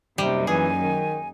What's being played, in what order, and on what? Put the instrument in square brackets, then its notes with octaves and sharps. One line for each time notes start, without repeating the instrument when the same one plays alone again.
[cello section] F#2 A#3 D#4 [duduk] C3 [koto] G3
[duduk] E3 [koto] G#4 [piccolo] G#5
[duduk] D#3